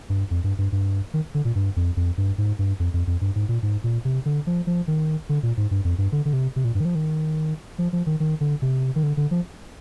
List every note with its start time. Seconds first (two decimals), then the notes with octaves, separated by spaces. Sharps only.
0.10 G2
0.31 F2
0.44 G2
0.58 G2
0.72 G2
1.14 D#3
1.34 D3
1.45 A#2
1.55 G2
1.76 F2
1.97 F2
2.18 G2
2.38 G#2
2.59 G2
2.80 F2
2.94 F2
3.07 F2
3.21 G2
3.36 G#2
3.49 A#2
3.63 G#2
3.84 A#2
4.05 C3
4.26 D3
4.47 F3
4.67 F3
4.88 D#3
5.29 D3
5.43 A#2
5.57 G#2
5.71 G2
5.85 F2
5.98 G2
6.12 D3
6.25 D3
6.33 C3
6.56 C3
6.64 A#2
6.75 G2
6.80 D#3
6.85 F3
6.95 D#3
7.79 F3
7.93 F3
8.06 D#3
8.20 D#3
8.41 D3
8.62 C3
8.96 D#3
9.03 D3
9.17 D3
9.31 F3